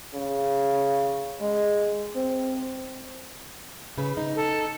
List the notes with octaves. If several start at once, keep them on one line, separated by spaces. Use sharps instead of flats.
C#3
G#3
C4
C#3 B4
D#4
A4